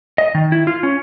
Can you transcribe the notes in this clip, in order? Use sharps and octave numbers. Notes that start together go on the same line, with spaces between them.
D#5
D#3
E4
F4
C#4